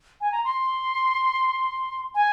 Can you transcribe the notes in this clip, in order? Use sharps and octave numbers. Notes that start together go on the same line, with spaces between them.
G#5
A#5
C6
G#5